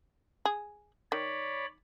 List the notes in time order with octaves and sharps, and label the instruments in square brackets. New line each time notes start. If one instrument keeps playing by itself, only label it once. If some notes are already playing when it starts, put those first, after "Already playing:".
[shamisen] G#4
[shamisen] D#3 [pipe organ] C#5 D5 B5